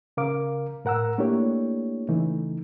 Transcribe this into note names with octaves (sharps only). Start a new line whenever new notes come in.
C#3 A#4 F5 D6
A2 A#4 F#5 A#5 E6
A3 A#3 D4 E4 G4 C#5
C#3 E3 A3 D#4